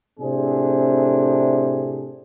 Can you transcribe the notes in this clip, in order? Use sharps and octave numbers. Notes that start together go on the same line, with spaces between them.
A2 C3 C4 D4 G#4